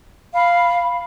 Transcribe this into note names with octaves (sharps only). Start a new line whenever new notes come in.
F5 B5